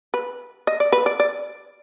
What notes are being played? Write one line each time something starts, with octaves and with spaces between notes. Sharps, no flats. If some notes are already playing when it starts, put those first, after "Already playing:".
B4
D#5
D5
B4
D5
D5